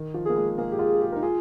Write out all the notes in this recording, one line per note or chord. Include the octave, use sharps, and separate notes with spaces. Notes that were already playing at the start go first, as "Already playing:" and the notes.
Already playing: D#3
F3
A#3 G#4
G#3
A#3 G#4
G4
F4
G4
D#4 A#4
F4 G#4